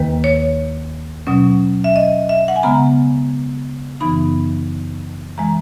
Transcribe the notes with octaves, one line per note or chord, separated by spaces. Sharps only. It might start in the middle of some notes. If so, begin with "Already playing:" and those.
Already playing: D#2 D#3 A#3 B4
C#5
B2 F#3 C#4
E5
D#5
E5
F#5
G#5
C#3 G#3 B3 A#5
F#2 C#3 E3 B3 D#4 B5
E3 G#3 A#5